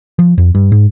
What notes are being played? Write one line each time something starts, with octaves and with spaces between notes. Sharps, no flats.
F3
F2
G2
G#2